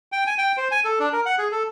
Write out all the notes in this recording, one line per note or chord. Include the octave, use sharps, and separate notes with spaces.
G5
G#5
G5
C5
G#5
A4
D4
A#4
F#5
G#4
A4